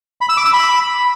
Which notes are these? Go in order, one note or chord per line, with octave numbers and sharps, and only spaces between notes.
B5
E6
D6
E6
B5